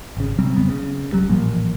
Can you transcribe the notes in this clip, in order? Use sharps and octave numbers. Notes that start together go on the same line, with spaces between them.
G#1 C#3
C3 F#3 G3 C4
F1 C#3 B3
C#3
F#1 C#2 F#3 G3
A1 A#2 F3 A#3